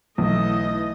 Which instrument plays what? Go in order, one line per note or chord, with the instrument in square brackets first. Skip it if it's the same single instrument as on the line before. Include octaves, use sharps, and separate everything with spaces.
[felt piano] B1 [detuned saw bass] E3 [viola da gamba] A3 [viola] D#5